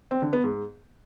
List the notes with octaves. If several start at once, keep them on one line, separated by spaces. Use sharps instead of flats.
C4
D3
B3
G#2